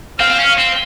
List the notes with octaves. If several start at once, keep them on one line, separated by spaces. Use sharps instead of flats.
C4 F5
C4
C#4
C4